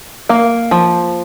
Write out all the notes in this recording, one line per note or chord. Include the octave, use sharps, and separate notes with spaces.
A#3
F3